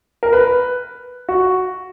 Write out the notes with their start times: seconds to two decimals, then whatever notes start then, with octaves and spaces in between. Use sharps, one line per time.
0.23 A#4
0.33 B4
1.29 F#4